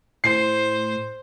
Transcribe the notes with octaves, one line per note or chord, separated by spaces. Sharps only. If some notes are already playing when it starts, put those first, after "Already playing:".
A2 C5 C7